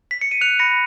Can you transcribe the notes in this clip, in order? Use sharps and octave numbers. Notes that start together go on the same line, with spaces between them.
B6
C#7
D#7
F#6 C#7 F7
B5 A#6 C#7